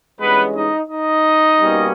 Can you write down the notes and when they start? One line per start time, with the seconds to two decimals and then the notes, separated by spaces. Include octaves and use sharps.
0.20 G2 E3 G#3 B3 C#4 B4
0.55 D#4 D#5
0.90 D#4 D#5
1.61 B2 G3 A#3 C#4